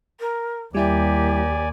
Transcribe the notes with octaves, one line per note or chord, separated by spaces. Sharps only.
A#4
D#2 G3 E4 G4 D5 G#5